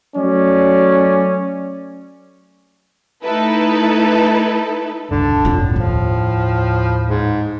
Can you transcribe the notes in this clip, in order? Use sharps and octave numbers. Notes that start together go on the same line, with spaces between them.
F#3 A3 C#4 D5
A3 D#4 E4 A4 B4
E1 C#2 G2 D3 A5
F2 A2 F4
D#2 F3
G#2